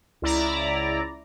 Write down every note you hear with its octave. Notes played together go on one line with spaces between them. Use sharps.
C#2 E4 D5 A#5